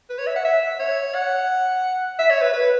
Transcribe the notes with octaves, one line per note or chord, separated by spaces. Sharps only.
B4
C#5
E5
F#5
E5
C#5
F#5
E5
C#5
B4
B4